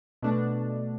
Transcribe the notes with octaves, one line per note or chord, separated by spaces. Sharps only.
B2 A3 D4